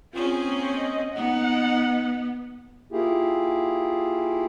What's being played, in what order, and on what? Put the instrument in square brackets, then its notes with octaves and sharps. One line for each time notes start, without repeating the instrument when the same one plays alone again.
[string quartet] C4 C#4 G#4 [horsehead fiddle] F4
[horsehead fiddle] A#3
D#5
[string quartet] B3 [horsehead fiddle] D#4 F#5
[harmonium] A#3 E4 F4 G4 G#4